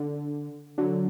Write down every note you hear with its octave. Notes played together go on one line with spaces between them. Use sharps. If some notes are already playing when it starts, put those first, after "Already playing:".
Already playing: D3
D3 F#3